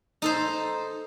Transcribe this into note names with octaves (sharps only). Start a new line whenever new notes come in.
D#4 A4 C5